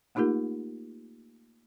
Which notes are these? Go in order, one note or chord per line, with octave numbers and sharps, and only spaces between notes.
A3 A#3 D#4 F4 G4 A#4